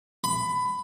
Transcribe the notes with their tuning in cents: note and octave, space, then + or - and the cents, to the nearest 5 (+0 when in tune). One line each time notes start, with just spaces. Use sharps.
B5 +20